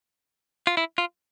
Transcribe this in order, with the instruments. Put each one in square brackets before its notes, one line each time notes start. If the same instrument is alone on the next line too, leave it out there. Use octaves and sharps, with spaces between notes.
[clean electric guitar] F4
E4
F4